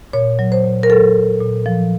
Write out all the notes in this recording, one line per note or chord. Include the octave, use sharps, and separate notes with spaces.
A#2 C#5
F#3
C5
A#2
A#4
F#3 A4
A#2
A#2
F3